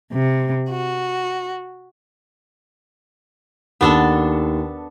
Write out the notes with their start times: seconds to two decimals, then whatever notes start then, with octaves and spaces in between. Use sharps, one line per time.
0.12 C3
0.69 F#4
3.81 D#2 B3 D4 A4